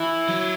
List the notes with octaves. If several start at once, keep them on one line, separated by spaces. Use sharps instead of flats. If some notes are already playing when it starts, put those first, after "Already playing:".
Already playing: E3 E4
F#3